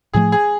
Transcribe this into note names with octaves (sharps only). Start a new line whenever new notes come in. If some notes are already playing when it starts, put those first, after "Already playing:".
A2 F3 A3 G#4
G#4